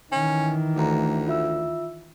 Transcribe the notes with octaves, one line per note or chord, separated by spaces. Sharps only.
D#3 E3 C#4
D2 A3 A#5
F4 E5 E6